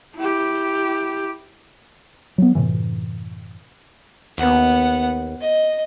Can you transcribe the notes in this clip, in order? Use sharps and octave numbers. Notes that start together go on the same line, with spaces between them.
E4 G4
F#3 B3
F#2 A2 C3 E3
D#2 B3 F#5
D#5